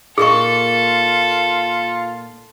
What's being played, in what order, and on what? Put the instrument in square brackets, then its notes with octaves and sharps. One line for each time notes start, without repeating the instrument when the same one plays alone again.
[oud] A#2 A#3 D#4 [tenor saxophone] F4 [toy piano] G#4 C#6 [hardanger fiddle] A4